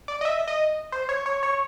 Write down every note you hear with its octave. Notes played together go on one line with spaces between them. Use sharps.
D5
D#5
E5
D#5
C5
C#5
C#5
C#5